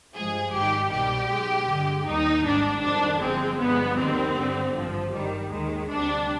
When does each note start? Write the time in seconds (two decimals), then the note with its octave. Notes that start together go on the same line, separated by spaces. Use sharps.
0.14 G2 F3 G#3 G#4
0.53 G#1 G#2 D#3 G3 G4
0.91 C2 B2 G3 G4
1.29 B1 B2 G#3
1.67 G2 D3 G#3
2.05 D#2 D#3 G3 D#4
2.44 G#1 G#2 G3 D4
2.82 F2 D#3 G3 D4
3.20 G1 G2 F3 G#3 C4
3.59 G1 G2 D3 F3 G#3 B3
3.97 D#2 D#3 G3 C4
4.35 G2 D3 G3
4.73 G#1 G2 F3
5.11 G2 D#3 G3
5.50 D#2 D#3 G#3
5.88 D2 C3 G3 D4